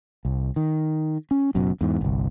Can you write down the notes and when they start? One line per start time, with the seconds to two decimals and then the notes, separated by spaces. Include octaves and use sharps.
0.25 C2
0.56 D#3
1.31 C#4
1.55 F#1 F#2 B2
1.81 E2 G#2
2.01 G1 C2